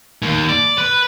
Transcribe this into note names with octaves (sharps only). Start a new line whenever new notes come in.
D#2
D5
B4